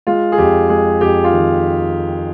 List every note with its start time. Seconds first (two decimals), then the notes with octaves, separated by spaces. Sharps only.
0.07 G#3 F4
0.32 G#4
0.38 F2 G4
0.69 G#3 G#4
1.01 F2 G4
1.24 F4
1.32 D#3